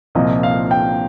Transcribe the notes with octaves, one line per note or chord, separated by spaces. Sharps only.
C2 A#2 F3 A#3 D#5
F5
G5